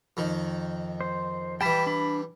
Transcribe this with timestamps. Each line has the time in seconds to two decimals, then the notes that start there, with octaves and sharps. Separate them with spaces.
0.17 F2 D#3
1.01 C5
1.61 E3 G3 G5 A5 B5
1.87 D4 B5